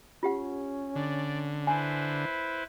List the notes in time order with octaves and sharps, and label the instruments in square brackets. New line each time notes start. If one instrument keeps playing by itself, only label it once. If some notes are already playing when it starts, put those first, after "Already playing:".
[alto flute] C#4 [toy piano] F4 G4 F#5
[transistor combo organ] D3 [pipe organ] D5
[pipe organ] E4 B4 C5 [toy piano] G#5